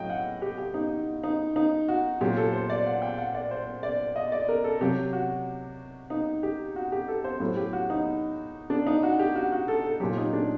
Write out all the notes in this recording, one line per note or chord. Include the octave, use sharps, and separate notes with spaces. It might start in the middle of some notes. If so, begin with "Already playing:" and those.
Already playing: A2 F#3 D#5 G5
F#5
G4
G4
D#4
D#4
D#4
F#4
A#2 F#3 G4
A4
C5
D5
F#5
G5
F#5
D5
C5
D5
D#5
D5
A#4
A4
C3 F#3 G4
F#4
D#4
G4
F#4
G4
A4
C5
A2 F#3
G4
F#4
D#4
D4
D#4
F#4
G4
F#4
F#4
A4
A4
A#2 F#3 G4
D#4
D4